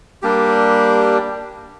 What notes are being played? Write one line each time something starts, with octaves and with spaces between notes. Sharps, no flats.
G3 A#3 D4 G4